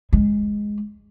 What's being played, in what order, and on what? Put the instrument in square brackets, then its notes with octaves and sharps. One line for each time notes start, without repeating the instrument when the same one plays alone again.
[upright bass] G#3